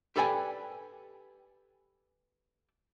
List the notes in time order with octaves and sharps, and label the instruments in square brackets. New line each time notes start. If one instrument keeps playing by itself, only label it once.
[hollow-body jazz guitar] G4 A4 B4 D5 G5 G#5